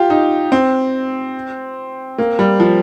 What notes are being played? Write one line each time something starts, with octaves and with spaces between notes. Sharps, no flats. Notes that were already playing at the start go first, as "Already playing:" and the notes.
Already playing: F4 G4
D#4
C4
A#3
G3
F3